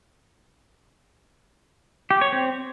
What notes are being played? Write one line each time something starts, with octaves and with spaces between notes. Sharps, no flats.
G4
C#5
C4